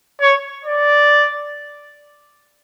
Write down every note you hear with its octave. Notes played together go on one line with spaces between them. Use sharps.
C#5
D5